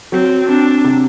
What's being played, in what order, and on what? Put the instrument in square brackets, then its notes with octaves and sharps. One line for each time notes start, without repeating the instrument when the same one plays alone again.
[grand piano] F#3 [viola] C4
[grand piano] C4 [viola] D4
[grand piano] C3